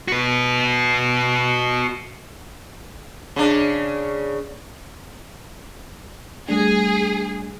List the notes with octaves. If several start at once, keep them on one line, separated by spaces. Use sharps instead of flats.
F#4 B4
C#3 D4
G3 A3 D4 G#4